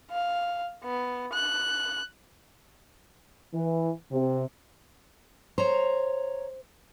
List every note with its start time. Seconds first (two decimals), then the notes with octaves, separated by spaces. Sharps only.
0.11 F5
0.84 B3
1.33 F#6
3.53 E3
4.12 C3
5.58 C5 C#5 A#5